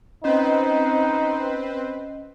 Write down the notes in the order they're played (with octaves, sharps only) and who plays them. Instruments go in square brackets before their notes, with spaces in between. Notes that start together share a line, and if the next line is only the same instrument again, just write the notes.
[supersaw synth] C4 B4 C5 [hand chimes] C#4 D#5 [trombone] D#4